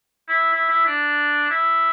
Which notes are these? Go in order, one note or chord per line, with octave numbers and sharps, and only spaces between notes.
E4
E4
E4
D4
E4